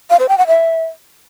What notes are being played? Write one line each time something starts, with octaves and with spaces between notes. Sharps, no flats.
F5
C5
G5
F#5
E5